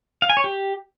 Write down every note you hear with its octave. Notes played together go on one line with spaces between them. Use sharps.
F5
G#5
C#5
G4